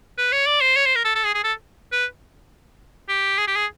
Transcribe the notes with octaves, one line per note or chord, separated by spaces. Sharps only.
B4
C#5
D5
C5
C#5
C5
A#4
A4
A4
G#4
G#4
A4
B4
G4
G#4
G4
G#4